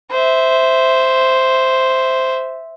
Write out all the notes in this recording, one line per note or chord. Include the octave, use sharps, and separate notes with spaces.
C5 E5